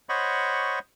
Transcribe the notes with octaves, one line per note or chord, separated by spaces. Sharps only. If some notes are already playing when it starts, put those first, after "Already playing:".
C5 C#5 D#5 F#5 B5 C#6